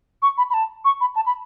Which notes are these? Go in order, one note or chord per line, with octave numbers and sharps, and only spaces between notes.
C#6
B5
B5
A5
C#6
B5
A5
B5